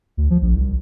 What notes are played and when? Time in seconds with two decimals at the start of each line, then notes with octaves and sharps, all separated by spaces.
0.17 D2
0.30 F3
0.42 A#1
0.55 C2